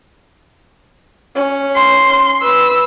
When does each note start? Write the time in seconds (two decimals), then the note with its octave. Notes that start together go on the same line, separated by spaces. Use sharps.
1.35 C#4
1.76 C6
2.42 B4 E6